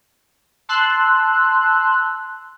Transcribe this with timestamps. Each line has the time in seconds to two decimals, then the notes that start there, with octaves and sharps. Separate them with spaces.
0.69 A5 C6 E6 F#6